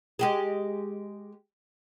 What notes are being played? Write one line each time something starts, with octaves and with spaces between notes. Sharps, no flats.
G#3 G4 G#4